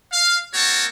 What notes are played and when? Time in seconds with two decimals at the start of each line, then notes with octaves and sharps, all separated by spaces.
0.12 F5
0.54 A#3 C4 F#4 C#5 A5